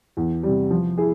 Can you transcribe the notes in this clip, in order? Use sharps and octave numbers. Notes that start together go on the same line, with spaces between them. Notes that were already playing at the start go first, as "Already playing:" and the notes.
E2
C3 G3
F3
E4 G#4